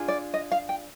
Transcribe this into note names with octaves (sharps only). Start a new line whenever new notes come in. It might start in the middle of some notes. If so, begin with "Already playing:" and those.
Already playing: D4 F4 G#4
D5
D#5
F5
G5